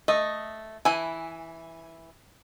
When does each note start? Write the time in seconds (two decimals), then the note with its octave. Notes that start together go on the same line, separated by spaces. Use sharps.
0.08 A3 D#5
0.85 E3 E4 G#5